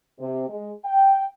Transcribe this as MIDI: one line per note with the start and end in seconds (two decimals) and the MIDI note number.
0.19 0.47 48
0.49 0.72 56
0.85 1.24 79